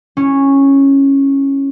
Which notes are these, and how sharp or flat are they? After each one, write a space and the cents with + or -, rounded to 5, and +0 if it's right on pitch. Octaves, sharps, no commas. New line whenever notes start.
C#4 -10 E4 +0